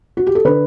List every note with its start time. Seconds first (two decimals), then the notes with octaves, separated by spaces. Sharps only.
0.17 F#4
0.27 G4
0.35 A4
0.45 D3 B4